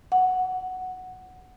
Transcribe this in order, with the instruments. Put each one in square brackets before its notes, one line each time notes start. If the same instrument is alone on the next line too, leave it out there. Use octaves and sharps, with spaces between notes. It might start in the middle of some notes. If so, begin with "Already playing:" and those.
[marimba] F#5